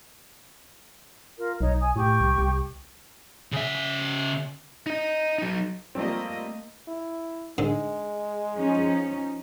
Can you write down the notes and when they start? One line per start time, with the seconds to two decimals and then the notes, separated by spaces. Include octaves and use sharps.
1.38 F4 A#4
1.61 B1 D#4 C#5
1.80 G#5 D#6
1.96 A2 G4 C#6
2.20 C2
2.38 C2
3.52 C#3 E5
4.86 D#4 D#5
5.38 F#3 D#4
5.95 F3 G3 A3 A#3 C4 D#5
6.87 E4
7.58 G#2 D3 G#3
8.55 F3 C#4 D#4